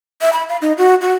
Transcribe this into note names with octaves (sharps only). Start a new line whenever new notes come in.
E5
B5
F5
D#4
F#4
F#4